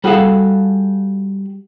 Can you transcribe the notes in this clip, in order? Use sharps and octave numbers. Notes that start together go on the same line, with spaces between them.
G3 F#4 G#4 A4 F5